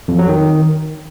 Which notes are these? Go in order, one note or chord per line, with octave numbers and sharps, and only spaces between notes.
F2
F#3
D#3